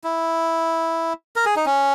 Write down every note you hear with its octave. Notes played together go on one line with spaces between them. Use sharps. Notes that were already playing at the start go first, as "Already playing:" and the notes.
E4
A#4
G#4
D#4
C#4